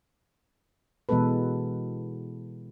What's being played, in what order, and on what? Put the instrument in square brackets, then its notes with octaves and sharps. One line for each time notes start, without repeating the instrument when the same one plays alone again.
[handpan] B2 E3 G#3 B3 A4 B4